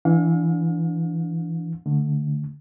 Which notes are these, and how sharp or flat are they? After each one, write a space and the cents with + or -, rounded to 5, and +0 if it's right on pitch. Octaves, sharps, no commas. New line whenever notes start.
E3 +10 D4 -5 F5 +40
D3 +0 A3 +0